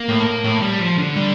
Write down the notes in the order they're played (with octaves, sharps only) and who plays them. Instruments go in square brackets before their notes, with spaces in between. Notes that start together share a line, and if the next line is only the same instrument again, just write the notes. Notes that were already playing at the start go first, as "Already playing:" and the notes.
Already playing: [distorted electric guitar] A#3
[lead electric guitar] A2
A2
[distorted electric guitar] G3
F3
D3
[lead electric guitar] G3